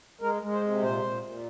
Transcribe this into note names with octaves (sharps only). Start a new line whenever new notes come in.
G#3 A#4
G#3
C5
C3
A#2 C5
A#2
A#2